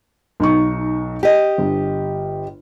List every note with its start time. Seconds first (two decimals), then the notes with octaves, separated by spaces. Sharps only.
0.40 B1 D#4 C#6
1.23 G4 D#5
1.58 G1